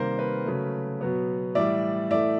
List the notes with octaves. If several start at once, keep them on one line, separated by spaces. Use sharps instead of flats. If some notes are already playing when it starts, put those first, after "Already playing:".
Already playing: C3 D#3 G3 A#3 A#4 C5
B4
C#3 F#3 A3
B2 F#3 B3
A2 E3 G3 D5 E5
A2 E3 A3 D5 E5